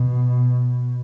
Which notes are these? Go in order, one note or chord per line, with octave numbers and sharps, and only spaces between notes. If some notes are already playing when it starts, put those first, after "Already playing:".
Already playing: B2